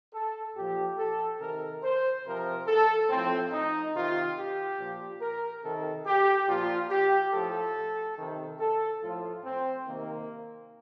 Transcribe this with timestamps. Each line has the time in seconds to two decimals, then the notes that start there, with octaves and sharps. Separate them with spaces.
0.14 A4
0.56 A#2 F3 G4
0.98 A4
1.41 C3 D#3 A#4
1.83 C5
2.26 C3 F3 A#4
2.67 A4
3.10 A2 F3 C4
3.52 D#4
3.94 C3 D#3 F4
4.37 G4
4.79 A#2 F3
5.22 A#4
5.64 C3 D#3 A4
6.06 G4
6.48 A#2 F3 F4
6.90 G4
7.33 A2 F3 A4
8.17 C3 D#3
8.60 A4
9.02 A2 F3 F4
9.44 C4
9.87 C3 D#3 A#3